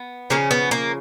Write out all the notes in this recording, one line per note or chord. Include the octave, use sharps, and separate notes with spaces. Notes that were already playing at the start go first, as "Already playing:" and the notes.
Already playing: B3
C#3 F3 A#3 C#4
B3
A#3